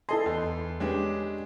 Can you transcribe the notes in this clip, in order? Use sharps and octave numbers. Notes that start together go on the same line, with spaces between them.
E4 A4 D#5 G#5 C6
E2
G#3 C#4 D4 G4 B4